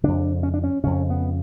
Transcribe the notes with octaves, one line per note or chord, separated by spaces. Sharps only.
F2 C#3 D4
C#4
D4
C#4
F2 C#3 C#4
B3